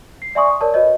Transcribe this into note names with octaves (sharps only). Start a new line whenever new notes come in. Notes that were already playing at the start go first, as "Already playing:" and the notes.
C7
D5 E5 G#5 C6 C#6 D#6
D#6
A#4 C#5 D5 A5
F#4 B4 C#5 D#5